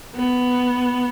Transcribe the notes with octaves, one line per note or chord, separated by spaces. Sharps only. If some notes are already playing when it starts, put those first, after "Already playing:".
B3